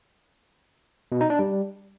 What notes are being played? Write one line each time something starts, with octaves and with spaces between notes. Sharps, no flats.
B2
D#4
D4
G3